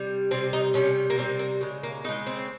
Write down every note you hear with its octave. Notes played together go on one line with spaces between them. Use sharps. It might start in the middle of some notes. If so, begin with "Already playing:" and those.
Already playing: C3 G3
C3 G3 C4
D#4
C3 G3 C#4
A#3
C3 G3 C4
A#3
C#3 G#3
A#3
C#3 G#3 D#4
C4